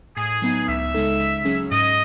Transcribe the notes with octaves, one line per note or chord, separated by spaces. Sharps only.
A2 G#4
F#3 B3 D#4
C#2 E5
C#3 G#3 D#4 A4
C#3
F#3 C#4 G#4
G#2 D#5